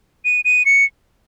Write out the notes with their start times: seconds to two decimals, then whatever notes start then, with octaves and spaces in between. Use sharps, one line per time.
0.25 D#7
0.45 D#7
0.66 C#7